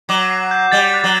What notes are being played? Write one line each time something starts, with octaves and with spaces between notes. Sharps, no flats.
F#3 D6
C7
G6
G3 A6
F#6
F#3